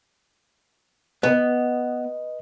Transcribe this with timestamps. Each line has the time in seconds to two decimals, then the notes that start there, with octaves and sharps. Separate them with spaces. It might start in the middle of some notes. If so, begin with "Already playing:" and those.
1.23 B3 B4 D#5